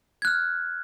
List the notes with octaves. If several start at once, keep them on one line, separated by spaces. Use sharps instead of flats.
F6 F#6 G#6